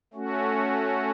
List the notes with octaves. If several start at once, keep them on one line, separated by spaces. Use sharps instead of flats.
A3 C#4 F#4